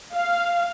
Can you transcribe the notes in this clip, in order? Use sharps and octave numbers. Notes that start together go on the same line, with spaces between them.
F5